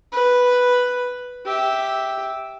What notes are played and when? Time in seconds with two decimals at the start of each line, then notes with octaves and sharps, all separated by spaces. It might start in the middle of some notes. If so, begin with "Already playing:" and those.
0.12 B4
1.45 G4 E5